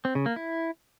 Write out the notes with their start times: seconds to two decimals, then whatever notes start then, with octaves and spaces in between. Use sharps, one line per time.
0.05 C4
0.15 C#3
0.26 A#3
0.36 E4